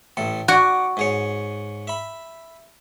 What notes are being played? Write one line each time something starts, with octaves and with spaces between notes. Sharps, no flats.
A1 A2 A4
F#4 D5 F#5 G#5
G#2 G#4 C#5
E5 B5